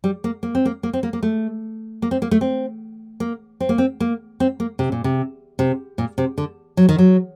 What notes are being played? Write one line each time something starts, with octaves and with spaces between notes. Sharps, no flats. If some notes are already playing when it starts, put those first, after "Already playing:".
G3
A#3
A#3
C4
A#3
A#3
C4
A#3
A#3
A3
A#3
C4
A#3
A3
C4
A#3
C4
A#3
C4
A#3
C4
A#3
C3
A#2
C3
C3
A#2
C3
D3
F#3
D#3
F#3